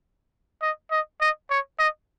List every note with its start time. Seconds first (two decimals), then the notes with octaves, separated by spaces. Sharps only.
0.62 D#5
0.91 D#5
1.21 D#5
1.50 C#5
1.79 D#5